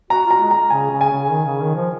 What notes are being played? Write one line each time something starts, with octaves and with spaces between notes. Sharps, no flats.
F#4 A#5
F4 A#5
G#3
A#5
C#3 G#5
C#3
G#5
C#3
D#3
C#3
D#3
F3